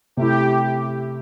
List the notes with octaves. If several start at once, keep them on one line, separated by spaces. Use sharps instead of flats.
C3 A3 E4 G4